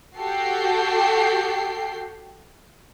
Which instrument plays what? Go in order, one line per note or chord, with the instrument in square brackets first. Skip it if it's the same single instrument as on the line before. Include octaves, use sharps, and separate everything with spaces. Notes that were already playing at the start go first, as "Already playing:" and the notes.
[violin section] F#4 G4 A4 G5 C7